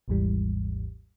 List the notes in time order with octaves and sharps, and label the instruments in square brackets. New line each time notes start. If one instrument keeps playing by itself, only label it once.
[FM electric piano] G#1 D#2 G#2 E3 G3